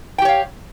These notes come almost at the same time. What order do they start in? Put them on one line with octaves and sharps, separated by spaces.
G5 G4 C#5 F5